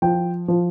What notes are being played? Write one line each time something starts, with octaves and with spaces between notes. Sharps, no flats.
F3 G5
F3